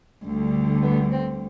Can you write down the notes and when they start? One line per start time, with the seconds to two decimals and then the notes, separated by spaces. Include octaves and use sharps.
0.24 D2 D3 G3
0.83 B3
1.11 C4